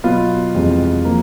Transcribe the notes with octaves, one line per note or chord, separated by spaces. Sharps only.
B2 F#3 B3 F4
F2 C3 E3 G#3
F3 A#3